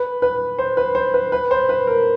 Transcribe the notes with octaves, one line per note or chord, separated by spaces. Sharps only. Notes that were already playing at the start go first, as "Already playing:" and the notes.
Already playing: B4
B4
C5
B4
C5
B4
B4
C5
B4
A#4